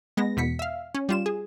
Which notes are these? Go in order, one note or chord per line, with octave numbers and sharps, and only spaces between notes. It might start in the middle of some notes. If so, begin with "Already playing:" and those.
G#3 B3 A#6
E2 B2 B6 C#7
E5 F5
C#4
G3 F4 E7
G#4